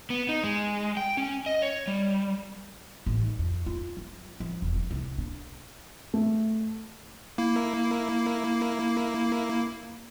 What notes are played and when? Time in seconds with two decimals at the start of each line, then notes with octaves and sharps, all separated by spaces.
0.10 B3
0.29 D#4
0.44 G#3
0.97 G5
1.17 C#4
1.46 D#5
1.62 C#5
1.88 G3
3.06 A1
3.21 D#3
3.39 F2
3.66 F4
3.97 F#3
4.40 F3
4.62 E1
4.76 F3
4.91 C2
5.18 D4
6.14 A3
7.38 A#3 E4